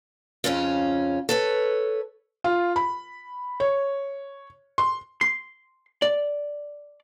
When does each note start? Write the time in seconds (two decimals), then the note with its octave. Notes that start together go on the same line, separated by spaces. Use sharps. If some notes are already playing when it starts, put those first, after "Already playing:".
0.44 F2 C#3 C#4 F4
1.29 A4 B4 C#5
2.44 F4
2.76 B5
3.60 C#5
4.78 C6
5.21 C6
6.02 D5